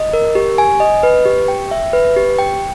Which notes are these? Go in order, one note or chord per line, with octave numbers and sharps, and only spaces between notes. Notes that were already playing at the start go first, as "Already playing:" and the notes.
Already playing: D#5
A#4
G4
G#5
D#5
B4
G4
G5
E5
B4
G4
G5